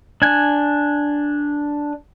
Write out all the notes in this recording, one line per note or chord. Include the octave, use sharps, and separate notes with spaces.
D4 G#5